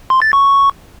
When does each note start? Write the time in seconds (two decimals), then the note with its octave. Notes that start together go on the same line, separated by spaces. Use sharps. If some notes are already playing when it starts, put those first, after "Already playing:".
0.10 C6
0.22 A6
0.33 C#6